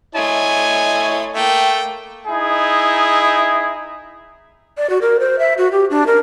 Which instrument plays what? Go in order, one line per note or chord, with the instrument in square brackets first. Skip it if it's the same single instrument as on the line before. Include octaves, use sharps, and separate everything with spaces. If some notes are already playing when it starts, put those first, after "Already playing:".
[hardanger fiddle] A3 C6 [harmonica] E4 C#5 D#5 [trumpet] G#5
[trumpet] A3 [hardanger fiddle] A#3 G5
[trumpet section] D#4 E4 G#4
[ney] D5
F#4
A#4
C5
E5
F#4
G4
D4
A#4